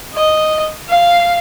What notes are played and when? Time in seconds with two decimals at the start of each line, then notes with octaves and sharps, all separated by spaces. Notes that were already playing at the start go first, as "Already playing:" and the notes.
0.14 D#5
0.89 F5